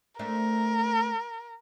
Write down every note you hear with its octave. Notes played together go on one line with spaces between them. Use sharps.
A3 C4 D4 A#4